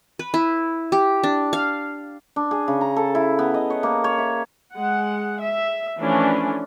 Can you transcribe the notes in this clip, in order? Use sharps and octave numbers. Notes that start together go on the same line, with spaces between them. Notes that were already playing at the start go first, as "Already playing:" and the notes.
B4
E4
G4
D4
F5
D4
G#4
C#3
A#5
A4
E4
B3
D#5
C#5
A#3
C#5
E5
G#3 F#5
E5
E3 F3 A3 C#4 D4